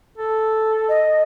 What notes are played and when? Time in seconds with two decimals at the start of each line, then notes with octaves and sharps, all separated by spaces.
0.18 A4
0.89 D#5